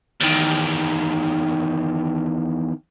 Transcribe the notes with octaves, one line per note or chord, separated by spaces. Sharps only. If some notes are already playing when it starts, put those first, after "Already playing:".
E2 D#3